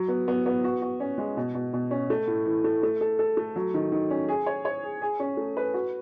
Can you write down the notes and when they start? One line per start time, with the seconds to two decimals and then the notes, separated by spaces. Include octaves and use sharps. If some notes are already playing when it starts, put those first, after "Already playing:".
Already playing: F#3
0.08 B3
0.28 B3
0.46 B3
0.64 F#4
0.82 F#4
1.00 C#4
1.18 G#3
1.37 B2
1.55 B2
1.73 B2
1.91 C#4
2.10 A3
2.27 A2
2.45 E3
2.64 A3
2.83 A3
3.01 A4
3.19 A4
3.37 A3
3.56 F#3
3.74 D#3
3.92 D#3
4.10 C#4
4.28 G#4
4.46 C#5
4.65 C#5
4.84 G#4
5.02 G#4
5.20 C#4
5.37 A3
5.57 B4
5.74 F#4